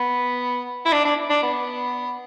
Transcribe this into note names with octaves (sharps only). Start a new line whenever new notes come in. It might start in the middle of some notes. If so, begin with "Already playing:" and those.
Already playing: B3
E4
D4
D4
D4
B3